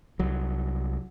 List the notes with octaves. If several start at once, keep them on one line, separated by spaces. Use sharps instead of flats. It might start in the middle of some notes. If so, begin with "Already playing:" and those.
C2 F#3